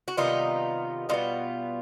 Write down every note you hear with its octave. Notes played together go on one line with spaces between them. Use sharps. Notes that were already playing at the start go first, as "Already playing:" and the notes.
F#4
C3 D#3 G3 B3 D#4 F4
B2 G3 B3 D#4 F4